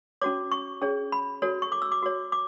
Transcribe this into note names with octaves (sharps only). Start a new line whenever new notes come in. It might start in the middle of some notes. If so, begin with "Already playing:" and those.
C#4 F#4 C#5 D6
C#6
C#4 G#4 C#5
B5
F#4 A4 C#5
C#6
D6
E6
D6
F#4 C#5
D6